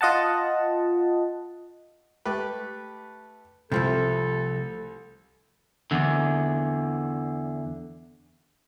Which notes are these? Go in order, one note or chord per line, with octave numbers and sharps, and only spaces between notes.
F4 D#5 F#5 A5
A3 G4 B4
C2 C3 F3 A3 A4
E2 D3